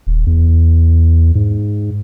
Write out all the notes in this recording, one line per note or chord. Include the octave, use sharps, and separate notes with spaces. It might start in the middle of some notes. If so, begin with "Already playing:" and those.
D#1
E2
G#2